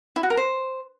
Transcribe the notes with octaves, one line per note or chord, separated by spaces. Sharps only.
E4
F#4
A#4
C5